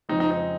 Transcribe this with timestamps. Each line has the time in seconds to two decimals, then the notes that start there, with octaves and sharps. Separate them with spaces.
0.09 F2 C#3 G#3 C4 D#4
0.20 D#4
0.31 D#4